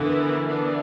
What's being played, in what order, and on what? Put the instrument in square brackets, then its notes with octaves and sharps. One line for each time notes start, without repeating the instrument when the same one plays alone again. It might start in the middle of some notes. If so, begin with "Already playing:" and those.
Already playing: [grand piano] D3 [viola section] E3 B3 E4 A#4
[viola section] E3 B3 D4